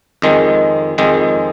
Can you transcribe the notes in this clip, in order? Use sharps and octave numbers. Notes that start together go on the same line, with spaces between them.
F2 D#3 G#3
F2 D#3 G#3